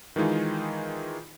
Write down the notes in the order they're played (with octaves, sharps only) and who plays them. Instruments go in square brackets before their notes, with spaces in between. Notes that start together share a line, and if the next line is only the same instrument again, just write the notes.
[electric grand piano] D#3 E3 G#3 D#4 F4